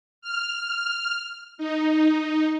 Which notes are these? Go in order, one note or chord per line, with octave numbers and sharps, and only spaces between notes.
F6
D#4